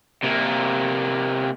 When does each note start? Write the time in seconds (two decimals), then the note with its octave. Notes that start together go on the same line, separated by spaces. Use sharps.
0.23 C3 A#3